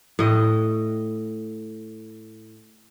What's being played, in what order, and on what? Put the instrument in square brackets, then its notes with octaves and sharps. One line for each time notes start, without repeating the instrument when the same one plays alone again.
[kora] A2 D#5